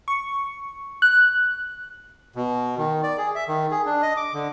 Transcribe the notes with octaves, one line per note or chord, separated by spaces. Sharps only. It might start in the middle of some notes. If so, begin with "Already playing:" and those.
C#6
F#6
B2
D#3
D5
G#4
E5
D#3
G#4
D4
D#5
D6
D3